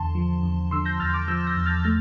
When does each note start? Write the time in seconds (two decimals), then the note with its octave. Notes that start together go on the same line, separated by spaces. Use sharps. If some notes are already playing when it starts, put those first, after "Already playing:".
Already playing: E2 D3 A5 C6
0.15 F3
0.43 E2
0.71 D3 C6 E6
0.85 G6 A#6
1.00 E2 F6 A6
1.14 D6 F6
1.28 F3 E6 G6
1.47 G6 A#6
1.57 E2
1.66 F6 A6
1.84 A3 F6 A6